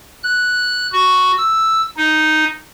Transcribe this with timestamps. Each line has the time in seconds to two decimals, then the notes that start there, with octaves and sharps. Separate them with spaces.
0.24 F#6
0.92 F#4
1.38 E6
1.97 D#4